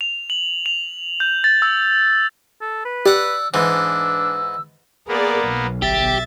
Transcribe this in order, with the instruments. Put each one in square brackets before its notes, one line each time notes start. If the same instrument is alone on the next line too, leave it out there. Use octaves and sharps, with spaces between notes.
[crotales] F7
F#7
F7
G6
A6
E6
[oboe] A4
B4
[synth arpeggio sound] G4 [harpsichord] D5 F#5 [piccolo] E6
[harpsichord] G#2 E3 [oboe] D4 [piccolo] E6
[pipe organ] A#3 B3 [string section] G#4 A#4 D5
[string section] B1
[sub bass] G1 [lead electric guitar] G4 [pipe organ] E5 A6